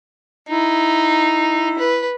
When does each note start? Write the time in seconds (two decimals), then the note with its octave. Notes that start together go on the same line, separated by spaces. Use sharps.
0.49 D#4 E4
1.79 B4